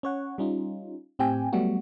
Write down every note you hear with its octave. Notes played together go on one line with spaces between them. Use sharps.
C#4 C#5 F#5
G3 C#4 D#4 F4
A2 C4 G4 G5 G#5
F#3 G3 A3 B3 F#4